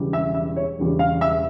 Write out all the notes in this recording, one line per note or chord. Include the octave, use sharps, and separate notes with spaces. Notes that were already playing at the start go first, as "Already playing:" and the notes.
Already playing: E1 E2 C#3 E3 G3
E5
E5
C#5
E1 E2 C#3 G3
F5
E5